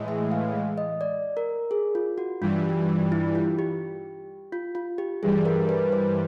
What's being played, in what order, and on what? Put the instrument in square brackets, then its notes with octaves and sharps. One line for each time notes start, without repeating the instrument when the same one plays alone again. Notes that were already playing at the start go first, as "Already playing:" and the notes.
Already playing: [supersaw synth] A2 E3 G#3
[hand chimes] E5
F5
D#5
D5
A#4
G#4
F4
F#4
[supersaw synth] G2 E3 G3 [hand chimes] F4
[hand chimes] E4
F4
G4
F4
F4
G4
[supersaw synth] G2 E3 G3 [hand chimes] G#4
[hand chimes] A#4
B4
C5